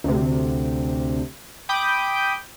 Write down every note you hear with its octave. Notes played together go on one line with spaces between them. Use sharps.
D2 C3
G5 B5 D6 D#6 G6